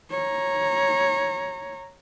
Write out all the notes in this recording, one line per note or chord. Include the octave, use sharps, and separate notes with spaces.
C#5 A#5